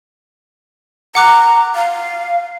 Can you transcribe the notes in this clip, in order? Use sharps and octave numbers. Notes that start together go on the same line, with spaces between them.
F#5 A#5 D6 F#6
F5